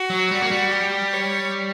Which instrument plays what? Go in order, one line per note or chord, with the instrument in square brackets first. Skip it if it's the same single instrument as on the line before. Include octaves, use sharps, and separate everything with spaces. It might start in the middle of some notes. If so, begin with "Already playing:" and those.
Already playing: [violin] F#4
[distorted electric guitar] F#3
G3
A#3
G3
[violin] G4
C#5